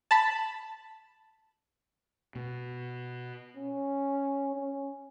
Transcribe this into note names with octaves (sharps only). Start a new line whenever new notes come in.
A5 B5
B2
C#4
C#4